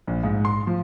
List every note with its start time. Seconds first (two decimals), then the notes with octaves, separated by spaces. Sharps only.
0.07 A#1
0.23 G#2
0.45 C6
0.67 F3